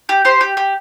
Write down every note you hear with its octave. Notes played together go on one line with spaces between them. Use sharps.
G4
G4 C5
G4
G4